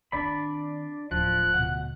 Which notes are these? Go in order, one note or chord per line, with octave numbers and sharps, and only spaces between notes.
D#3 C4 D4 D5 B5
D1 F3 F#6
D2 B2 F#5